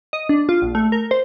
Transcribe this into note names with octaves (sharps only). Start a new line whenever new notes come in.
D#5
D4
F4
A#1
A3
A#4
C5